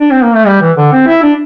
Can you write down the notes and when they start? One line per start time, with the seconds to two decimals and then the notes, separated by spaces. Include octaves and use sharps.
0.01 D4
0.11 C4
0.23 A#3
0.35 A3
0.47 G3
0.61 E3
0.77 D3
0.92 C4
1.07 E4
1.23 D4